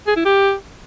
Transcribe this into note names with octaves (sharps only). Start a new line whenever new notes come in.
G#4
E4
G4